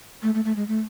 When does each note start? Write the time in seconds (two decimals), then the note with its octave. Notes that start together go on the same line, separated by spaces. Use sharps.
0.23 A3
0.35 A3
0.45 A3
0.56 G#3
0.68 A3